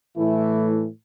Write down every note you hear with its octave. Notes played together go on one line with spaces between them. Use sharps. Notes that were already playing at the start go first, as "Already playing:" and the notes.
A2 E3 A3 E4